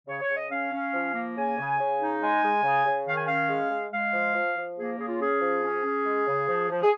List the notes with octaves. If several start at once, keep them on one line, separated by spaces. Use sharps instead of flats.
C#3 C#5
C#5
C#3
D#5
C#4 F5
C#4
F3
A#3
C#3 G#5
C#3
C#3
D#4
G#3 G#5
G#3
C#3
C#3
D#3 F5
G#5
C#4 F5
G#3
G#3
G#3 F5
F3
F3
F3
A#3 G#4
C#3 G#4
F4
C#4 G#4
F3
C#4
C#4
G#3
C#3
F3
F3
G#4